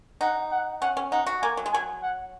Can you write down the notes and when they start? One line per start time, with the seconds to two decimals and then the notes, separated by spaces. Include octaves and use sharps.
0.21 D#4 F#5
0.51 F#5
0.81 C#4 F#5
0.97 C#4
1.12 D#4 F#5
1.27 F#4
1.42 A#3 G#5
1.57 F#3
1.66 G#3
1.72 F#3 G#5
2.02 F#5